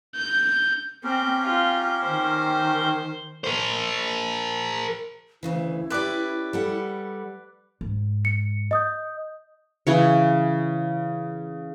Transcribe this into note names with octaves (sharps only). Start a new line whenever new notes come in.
G6
C4 C#4 G4 A#4
F4
D#3 C5
A#4 C5
D2 C#3 E3 E4
C#4 G4 B4 D5
G3 A4 F#5
G#2
C#7
D#5 D#6 G6
C#3 E3 C#5